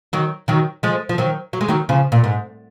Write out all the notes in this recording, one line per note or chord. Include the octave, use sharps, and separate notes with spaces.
D#3 F#3
D#3 F#3
F3 G#3
F3
D#3 F#3
F#3
G#3
D#3 F#3
C#3 F3
A#2
G#2